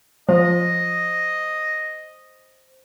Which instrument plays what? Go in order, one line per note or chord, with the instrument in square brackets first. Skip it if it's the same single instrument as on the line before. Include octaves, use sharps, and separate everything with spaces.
[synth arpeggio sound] F3 [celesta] C5 [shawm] D#5